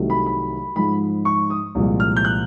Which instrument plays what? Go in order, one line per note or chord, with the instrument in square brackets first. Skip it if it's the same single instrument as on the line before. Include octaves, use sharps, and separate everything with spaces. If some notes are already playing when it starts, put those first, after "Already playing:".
Already playing: [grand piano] C2 C3 D#3 F#3 A3
B5
B5
G#2 F3 G#3 B5
C#6
D#6
C2 A#2 F3 G#3
F6
G6
F#6